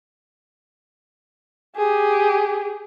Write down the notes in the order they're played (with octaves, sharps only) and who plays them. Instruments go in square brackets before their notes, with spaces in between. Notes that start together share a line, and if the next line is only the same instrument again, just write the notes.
[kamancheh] G4 G#4